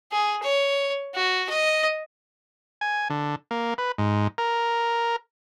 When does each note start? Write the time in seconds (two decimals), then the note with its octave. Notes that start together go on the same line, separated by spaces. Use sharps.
0.12 G#4
0.42 C#5
1.15 F#4
1.50 D#5
2.81 G#5
3.10 D3
3.51 A#3
3.78 B4
3.98 G#2
4.38 A#4